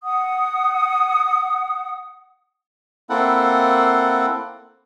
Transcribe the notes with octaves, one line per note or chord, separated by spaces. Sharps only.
F#5 D#6
A#3 C4 E4 A4 F#5